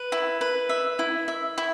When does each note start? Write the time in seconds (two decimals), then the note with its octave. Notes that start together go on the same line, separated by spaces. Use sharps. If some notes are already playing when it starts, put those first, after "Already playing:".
Already playing: B4
0.12 E4
0.41 B4
0.69 E5
0.99 E4
1.28 E5
1.58 E4